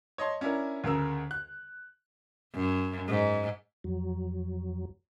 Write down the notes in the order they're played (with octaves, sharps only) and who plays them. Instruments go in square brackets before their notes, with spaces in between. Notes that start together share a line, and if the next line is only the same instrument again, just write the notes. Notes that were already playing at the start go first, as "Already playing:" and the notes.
[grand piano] C#5 D#5 A5 C6
C#4 D4 E4 A#4
D2 C#3 A#4 E6
F#6
[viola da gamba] F#2
G#2
[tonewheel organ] F2 F#3